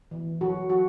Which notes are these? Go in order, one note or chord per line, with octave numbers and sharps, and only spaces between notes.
E3
F#3 F#4
F#3 F#4